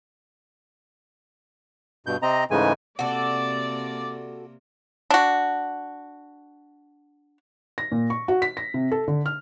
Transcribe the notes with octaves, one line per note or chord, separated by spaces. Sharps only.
G2 B2 G6
C3 C4 D#5 A#5
G#2 C#3 E3 G#3 A3 G#5
C3 A#3 F#4 A4 D5
D4 F#4
A#6
A#2
C#6
F#4
B6
A#6
C3
A4
D3
F6